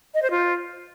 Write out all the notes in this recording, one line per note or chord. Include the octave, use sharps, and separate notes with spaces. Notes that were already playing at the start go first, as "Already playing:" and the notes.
D#5
C5
F4